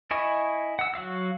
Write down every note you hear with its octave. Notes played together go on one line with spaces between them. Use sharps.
E4 D#5 G#5 C#6
F#5 E6
F#3 F#4 F5 E6